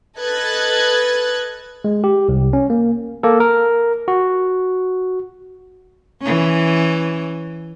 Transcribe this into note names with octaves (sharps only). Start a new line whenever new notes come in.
A4 B4 D#5 F#6 G#6 A6
G#3
G4
C2
C#4
A#3
A#3 A4
A#4
F#4
E3 C#4